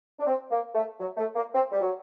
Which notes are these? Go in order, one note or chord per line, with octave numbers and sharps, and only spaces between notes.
D4
C4
A#3
A3
F#3
A3
A#3
C4
G3
F#3